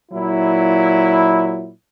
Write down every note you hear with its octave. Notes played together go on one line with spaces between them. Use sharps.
A#2 F#3 E4